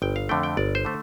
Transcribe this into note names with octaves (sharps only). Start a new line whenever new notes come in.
G1 G5
F5
F2 D3 A3 G5
G5
G1 D5
C5
D3 A3